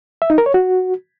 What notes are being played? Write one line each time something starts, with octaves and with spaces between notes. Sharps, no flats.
E5
D#4
A#4
C#5
F#4